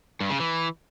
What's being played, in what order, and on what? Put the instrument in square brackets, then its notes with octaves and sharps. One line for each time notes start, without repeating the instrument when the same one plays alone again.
[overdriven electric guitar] G2
C#3
E3